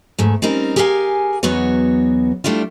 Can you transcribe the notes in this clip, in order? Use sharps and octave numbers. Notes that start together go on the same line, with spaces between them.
E2 G#2 A3
G3 C4 C#4 D#4 A#4
G4 G#4 A#4 F5 F#5 G#5
E2 F#3 B3 D#4 F#4 C#5
G3 A3 D4 E4 F4